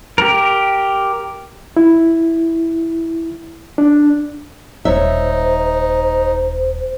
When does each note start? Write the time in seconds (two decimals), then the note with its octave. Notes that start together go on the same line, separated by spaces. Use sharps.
0.18 G4 A#4
1.77 E4
3.78 D4
4.85 D#1 D#4 C5 C#5 E5